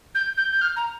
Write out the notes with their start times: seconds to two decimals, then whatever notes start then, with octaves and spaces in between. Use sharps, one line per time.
0.15 G6
0.37 G6
0.51 G6
0.61 F6
0.76 A#5